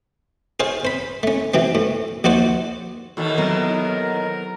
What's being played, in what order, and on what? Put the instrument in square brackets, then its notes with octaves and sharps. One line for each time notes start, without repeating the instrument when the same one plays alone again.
[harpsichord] G#4 C5 C#5 F5
C5 B5
A3 C#4
C3 E3 F#3 C4
A2
A#1 D#2 F#4 C5 D5
[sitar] D#2 B2 D#3 [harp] E3 F#4 A4
[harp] F#3 C4 E4 [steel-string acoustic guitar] B3 [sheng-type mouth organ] A#4